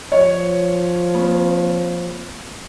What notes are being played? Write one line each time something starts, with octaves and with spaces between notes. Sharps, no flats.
F3 C#5
A#3 C4